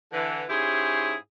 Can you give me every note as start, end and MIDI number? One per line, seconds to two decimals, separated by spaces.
0.13 0.43 50
0.13 0.43 52
0.49 1.15 44
0.49 1.15 61
0.49 1.15 64
0.49 1.15 67
0.49 1.15 68
0.49 1.15 84